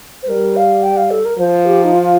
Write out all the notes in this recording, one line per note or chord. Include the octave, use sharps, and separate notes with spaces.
C5
G3 A#4
F5
G5
F5
A4
A#4
F3 C5
G4
D#4
F4